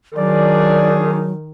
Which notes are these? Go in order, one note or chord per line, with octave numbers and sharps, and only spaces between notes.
D#3 F#3 D4 G#4 D5